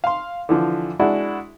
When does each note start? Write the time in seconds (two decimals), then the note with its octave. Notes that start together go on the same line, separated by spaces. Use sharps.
0.04 F5 C6
0.49 D3 E3 F3
0.99 G#3 D4 E4 F#4